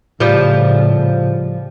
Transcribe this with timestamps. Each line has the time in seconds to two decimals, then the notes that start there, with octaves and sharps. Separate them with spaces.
0.20 A2 C#3 F3 G3